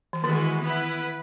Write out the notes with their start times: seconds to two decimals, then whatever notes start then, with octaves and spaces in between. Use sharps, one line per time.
0.13 E3
0.24 D#3 E3 G#3 B3 F#4
0.64 B3 E4 B4